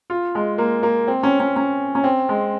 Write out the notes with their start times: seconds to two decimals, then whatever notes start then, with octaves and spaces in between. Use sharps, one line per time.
0.10 F4
0.35 G#3
0.58 A#3
0.83 A#3
1.07 C4
1.23 C#4
1.40 C#4
1.56 C#4
1.95 C#4
2.04 C4
2.29 G#3